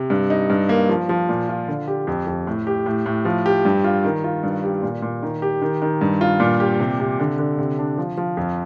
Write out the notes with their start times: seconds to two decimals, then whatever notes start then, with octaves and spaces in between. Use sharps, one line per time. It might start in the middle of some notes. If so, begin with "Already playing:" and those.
Already playing: C3
0.10 G2
0.30 D#4
0.50 G2
0.69 A#3
0.89 F3
1.09 F3
1.29 A#2
1.49 F4
1.68 D3
1.87 G4
2.07 F2
2.27 F2
2.47 A2
2.67 G4
2.86 A2
3.06 A2
3.25 F3
3.46 G4
3.65 G2
3.84 F4
4.04 D#3
4.24 F4
4.43 G2
4.63 G4
4.82 A#2
5.02 A#2
5.23 D#3
5.42 G4
5.62 D#3
5.82 D#3
6.01 G2
6.21 F4
6.40 A#2
6.60 G4
6.80 C3
7.00 C3
7.19 D3
7.38 D3
7.58 C3
7.78 D4
7.98 F3
8.17 F3
8.37 F2